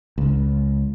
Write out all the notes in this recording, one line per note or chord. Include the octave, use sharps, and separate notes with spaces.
C#2